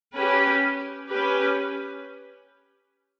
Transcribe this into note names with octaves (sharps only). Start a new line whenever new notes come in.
C#4 G4 B4
C#4 G4 B4